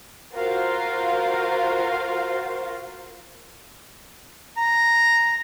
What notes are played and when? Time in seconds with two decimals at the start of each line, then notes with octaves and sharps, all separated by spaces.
0.34 F4 F#4 A#4 C5 F5
4.58 A#5